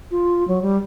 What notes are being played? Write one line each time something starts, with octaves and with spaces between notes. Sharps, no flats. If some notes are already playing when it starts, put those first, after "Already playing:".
F4
F#3
G3